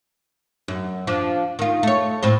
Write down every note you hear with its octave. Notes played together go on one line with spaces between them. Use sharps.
F#2
F3 D4
D#3 F4
A3 C#5
A2 C4 C5